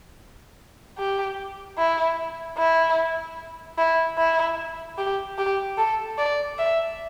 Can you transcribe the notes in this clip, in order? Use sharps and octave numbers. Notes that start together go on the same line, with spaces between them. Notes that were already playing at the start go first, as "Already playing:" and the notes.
G4
E4
E4
E4
E4
G4
G4
A4
D5
E5